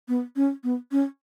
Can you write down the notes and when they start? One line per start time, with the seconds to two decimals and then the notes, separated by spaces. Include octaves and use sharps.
0.08 B3
0.36 C#4
0.64 B3
0.92 C#4